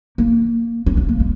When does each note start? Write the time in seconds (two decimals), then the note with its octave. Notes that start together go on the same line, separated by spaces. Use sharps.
0.18 A#3
0.86 C#4
0.97 C#4
1.09 A#3
1.20 G#3